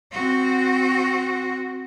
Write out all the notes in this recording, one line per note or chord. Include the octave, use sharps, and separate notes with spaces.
C4 F#4